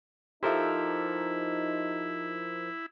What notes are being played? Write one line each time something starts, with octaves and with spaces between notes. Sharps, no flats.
F3 D#4 E4 G4 A4 A#4 C5 E5